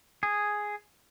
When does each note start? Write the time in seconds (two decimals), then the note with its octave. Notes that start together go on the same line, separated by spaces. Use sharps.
0.23 G#4